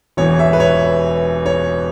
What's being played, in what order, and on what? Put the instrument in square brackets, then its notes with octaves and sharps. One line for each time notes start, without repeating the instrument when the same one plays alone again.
[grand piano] E1 E2 E3 C#5
E5
B4
C#5
C#5